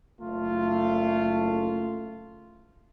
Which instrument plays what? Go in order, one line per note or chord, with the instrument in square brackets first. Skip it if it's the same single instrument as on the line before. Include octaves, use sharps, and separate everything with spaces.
[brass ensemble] F#1 A3 F4